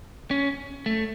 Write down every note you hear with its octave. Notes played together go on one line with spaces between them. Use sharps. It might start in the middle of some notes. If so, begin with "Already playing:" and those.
C#4
A3